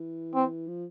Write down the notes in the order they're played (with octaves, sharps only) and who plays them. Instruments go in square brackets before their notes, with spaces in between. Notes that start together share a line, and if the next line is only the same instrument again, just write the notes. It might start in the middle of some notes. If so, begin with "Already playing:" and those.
Already playing: [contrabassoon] E3
[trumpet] C4
[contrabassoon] F3